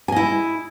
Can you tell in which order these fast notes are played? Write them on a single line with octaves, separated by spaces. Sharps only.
G#5 D#5 E4